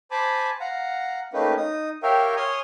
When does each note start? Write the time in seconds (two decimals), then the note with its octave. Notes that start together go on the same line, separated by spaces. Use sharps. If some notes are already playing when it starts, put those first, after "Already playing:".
0.11 C5 G#5 A5 B5 D6
0.60 F5 F#5 A#5
1.33 A3 A#3 C#4 D#4 G4 B4
1.57 D#4 D#6
2.03 G4 A#4 C#5 E5 F5 G5
2.37 C#5 G#5 C6 D#6 F6